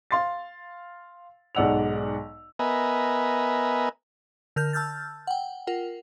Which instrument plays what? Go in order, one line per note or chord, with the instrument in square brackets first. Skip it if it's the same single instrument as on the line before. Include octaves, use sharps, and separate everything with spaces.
[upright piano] F5 C6 A6
B1 G#2 D5 F#5 E6 F7
[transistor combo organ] B3 A#4 B4 D#5 E5 G#5
[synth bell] D3 A#4 F6 G6
A5 E6 F6 G6 A6
F#5 G5
F4 A#4 F#5